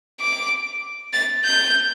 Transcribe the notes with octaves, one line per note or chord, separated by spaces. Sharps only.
D6
A6
G6